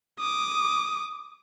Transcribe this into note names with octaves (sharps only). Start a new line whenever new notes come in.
D6 D#6